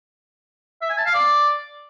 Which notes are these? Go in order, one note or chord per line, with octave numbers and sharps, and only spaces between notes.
E5
G#5
A5
F5
D5